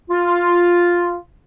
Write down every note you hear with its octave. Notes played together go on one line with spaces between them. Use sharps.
F4